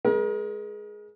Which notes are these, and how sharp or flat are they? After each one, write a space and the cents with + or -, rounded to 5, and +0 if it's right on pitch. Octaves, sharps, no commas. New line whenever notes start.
G#3 +10 A#4 +40